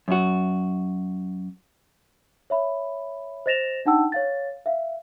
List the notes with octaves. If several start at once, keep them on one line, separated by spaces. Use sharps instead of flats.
F#2 F#4
C#5 E5 B5
C5 D#5 A6 A#6 E7 F7
D4 D#4 F#5 G5 A5 E6
C#5 F5 A6
E5 F5